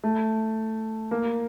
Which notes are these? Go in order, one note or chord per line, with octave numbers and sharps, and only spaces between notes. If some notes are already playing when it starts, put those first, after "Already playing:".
A3
A#3